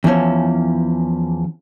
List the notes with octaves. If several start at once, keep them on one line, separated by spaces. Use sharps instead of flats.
E2 E3 F3 C#4